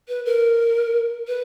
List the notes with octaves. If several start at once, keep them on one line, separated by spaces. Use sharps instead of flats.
B4
A#4
B4